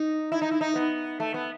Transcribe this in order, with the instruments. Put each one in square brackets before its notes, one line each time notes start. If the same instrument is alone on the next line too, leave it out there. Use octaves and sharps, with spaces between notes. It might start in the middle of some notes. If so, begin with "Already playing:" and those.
Already playing: [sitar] D#4
E4
D#4
E4
D#4
B3
A3
B3